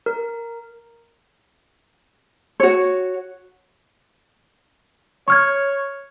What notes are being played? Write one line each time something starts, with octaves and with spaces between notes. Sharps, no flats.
A#4
F#4 C#5
C#5 C#6 F6 G#6